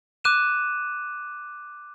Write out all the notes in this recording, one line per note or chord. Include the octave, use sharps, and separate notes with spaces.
D6 F#6 D#7 E7